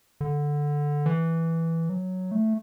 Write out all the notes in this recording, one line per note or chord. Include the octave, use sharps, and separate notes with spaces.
D3
E3
F#3
A3